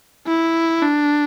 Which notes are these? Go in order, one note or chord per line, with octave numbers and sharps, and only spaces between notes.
E4
D4